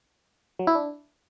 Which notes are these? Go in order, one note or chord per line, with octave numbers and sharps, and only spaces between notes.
F#3
E4
D4